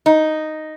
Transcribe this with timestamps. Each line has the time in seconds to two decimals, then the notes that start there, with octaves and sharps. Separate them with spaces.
0.06 D#4